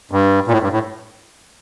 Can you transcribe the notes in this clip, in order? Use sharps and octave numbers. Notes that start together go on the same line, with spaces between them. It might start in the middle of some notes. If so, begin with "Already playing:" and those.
G2
A#2
A2
G2
A2